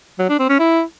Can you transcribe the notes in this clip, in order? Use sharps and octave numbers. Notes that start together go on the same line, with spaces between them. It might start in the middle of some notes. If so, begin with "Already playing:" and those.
F#3
D4
C4
C#4
E4